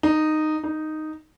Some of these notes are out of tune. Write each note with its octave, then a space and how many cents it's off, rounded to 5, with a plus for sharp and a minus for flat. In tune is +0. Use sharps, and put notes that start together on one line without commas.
D#4 -10
D#4 -5